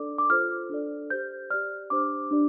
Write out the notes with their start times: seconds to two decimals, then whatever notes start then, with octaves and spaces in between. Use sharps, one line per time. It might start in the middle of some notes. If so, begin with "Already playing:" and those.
Already playing: D4 A4 D5 D6
0.18 D6
0.30 F4 A4 C5 F6
0.69 D4 A4 D5
1.10 G4 C5 G6
1.50 G4 D5 F6
1.90 D4 G4 C5 D6
2.31 D4 G4 D5